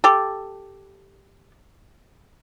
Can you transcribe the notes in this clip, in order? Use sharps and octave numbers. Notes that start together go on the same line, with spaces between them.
G4 A4